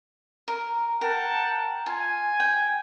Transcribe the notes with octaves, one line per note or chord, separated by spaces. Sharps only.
A#4
A#4 F#5 G5 A5
F4 G#5
G5